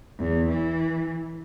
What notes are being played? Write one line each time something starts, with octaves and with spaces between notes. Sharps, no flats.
E2
E3